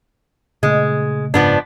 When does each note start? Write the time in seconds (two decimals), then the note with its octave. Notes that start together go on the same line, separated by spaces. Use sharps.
0.63 A#2 C#3 G#3 A3
1.34 F#1 G#2 C#3 F3 B3 D4